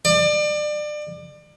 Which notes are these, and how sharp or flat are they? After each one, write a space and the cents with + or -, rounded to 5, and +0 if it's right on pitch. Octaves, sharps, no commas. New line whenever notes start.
D5 +30